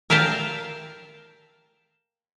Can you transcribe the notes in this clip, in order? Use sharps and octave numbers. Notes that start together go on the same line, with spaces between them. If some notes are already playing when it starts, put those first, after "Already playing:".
A#4 E5 F5 G5 A5